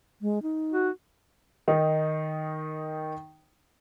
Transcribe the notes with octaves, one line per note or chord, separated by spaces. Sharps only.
G#3
D#4
F#4
D#3 D#4